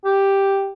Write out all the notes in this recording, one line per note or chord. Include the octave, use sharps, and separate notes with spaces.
G4